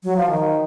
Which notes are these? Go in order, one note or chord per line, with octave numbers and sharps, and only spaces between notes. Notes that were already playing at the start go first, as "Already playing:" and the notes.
F#3
F3
D#3